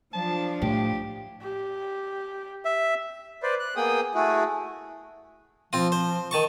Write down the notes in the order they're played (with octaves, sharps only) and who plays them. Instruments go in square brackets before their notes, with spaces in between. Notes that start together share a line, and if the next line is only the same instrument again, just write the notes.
[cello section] F3 D4 [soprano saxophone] A5
[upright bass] A2 [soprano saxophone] G4
[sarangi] G4
[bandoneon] E5
[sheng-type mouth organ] B4 C5 D5
F#6
A#3 B3 G#4 G5 D#6
A3 E4 F#4 G#4
[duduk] F3 [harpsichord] C4 F4
[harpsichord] C5
D#3 A5 C#6